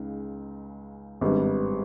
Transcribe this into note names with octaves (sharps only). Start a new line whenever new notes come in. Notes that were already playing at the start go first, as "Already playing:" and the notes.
Already playing: C#2 C#3 G#3 D#4
G#1 G2 G3 B3